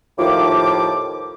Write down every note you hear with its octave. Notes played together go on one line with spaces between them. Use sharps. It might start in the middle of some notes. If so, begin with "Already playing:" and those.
D#2 A2 F3 D6